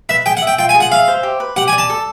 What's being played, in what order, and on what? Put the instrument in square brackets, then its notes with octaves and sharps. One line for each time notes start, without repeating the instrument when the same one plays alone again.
[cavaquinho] B4 [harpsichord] E5
[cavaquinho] G#4 [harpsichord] G5
[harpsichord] F#5
[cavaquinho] E5
[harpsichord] G5
[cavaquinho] F4 [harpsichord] G5
[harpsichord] G#5
[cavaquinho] G#4
[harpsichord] F#5
[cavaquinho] E5 [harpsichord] F5
[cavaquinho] C5
G4
B4
[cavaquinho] G4 [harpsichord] F#5
[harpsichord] G#5
[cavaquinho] D5
[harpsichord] A5
[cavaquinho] A4